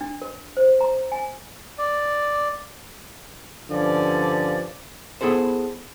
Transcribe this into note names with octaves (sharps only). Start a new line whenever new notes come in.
D4
A#4
C5
A#5
G#5
D5
G2 D3 F3 G3 C#4 D5
B3 E4 G#4 A4 C5